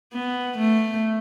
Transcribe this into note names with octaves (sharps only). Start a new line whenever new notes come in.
B3
A3